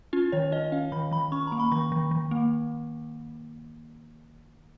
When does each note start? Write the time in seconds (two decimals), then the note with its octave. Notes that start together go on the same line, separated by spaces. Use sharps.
0.13 C#4 F4
0.32 D#3 C#5
0.52 C#4 D#5
0.72 C#4 F5
0.92 D#3 B5
1.11 D#3 B5
1.32 C#4 C#6
1.47 A#3 A#5
1.60 B5
1.71 D#3 C#6
1.92 D#3
2.11 D#3
2.31 A#3